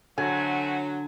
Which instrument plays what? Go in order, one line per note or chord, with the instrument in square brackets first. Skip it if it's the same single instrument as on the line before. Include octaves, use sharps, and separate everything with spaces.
[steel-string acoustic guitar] D3 [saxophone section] F#3 [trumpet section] A3 C4 F#4 [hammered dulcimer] G#5